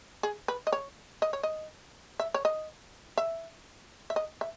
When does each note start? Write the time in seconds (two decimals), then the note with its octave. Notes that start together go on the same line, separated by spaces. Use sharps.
0.23 G#4
0.48 B4
0.67 D#5
0.72 C#5
1.22 D#5
1.33 C#5
1.43 D#5
2.20 E5
2.34 C#5
2.45 D#5
3.17 E5
4.10 E5
4.16 D#5
4.41 E5